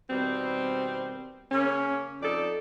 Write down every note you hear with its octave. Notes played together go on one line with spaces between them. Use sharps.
B2 D#3 G3 C4
C#3 A#3 C#4
F2 D#4 A4 D5